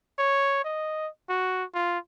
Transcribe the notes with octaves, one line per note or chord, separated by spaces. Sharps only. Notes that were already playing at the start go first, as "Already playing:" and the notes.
C#5
D#5
F#4
F4